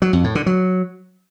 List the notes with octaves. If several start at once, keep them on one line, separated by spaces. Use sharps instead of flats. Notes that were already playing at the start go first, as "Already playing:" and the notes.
F#3
F2
A2
D3
F#3